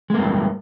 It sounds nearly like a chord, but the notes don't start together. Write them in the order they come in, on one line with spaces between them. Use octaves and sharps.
G#3 A#3 G2